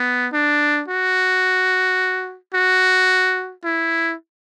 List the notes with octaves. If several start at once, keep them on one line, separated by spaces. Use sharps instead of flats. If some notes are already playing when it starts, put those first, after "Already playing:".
Already playing: B3
D4
F#4
F#4
E4